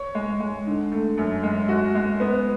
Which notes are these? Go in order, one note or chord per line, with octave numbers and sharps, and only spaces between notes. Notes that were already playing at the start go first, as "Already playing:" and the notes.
Already playing: C#5
G#3
G#3
D3
A3
F#2
G#3
F#4
G#3
B3